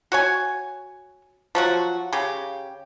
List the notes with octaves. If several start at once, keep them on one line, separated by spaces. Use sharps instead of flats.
F#4 C#5 G#5
F3 F#3 F#4
C#3 G4